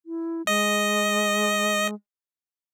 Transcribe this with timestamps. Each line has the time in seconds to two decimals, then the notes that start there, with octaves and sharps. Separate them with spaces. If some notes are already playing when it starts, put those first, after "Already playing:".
0.06 E4
0.47 G#3 D#5